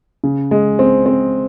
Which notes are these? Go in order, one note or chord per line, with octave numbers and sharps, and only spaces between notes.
C#3
G#3
C4
C4